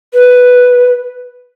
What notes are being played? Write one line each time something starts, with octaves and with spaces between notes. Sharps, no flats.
B4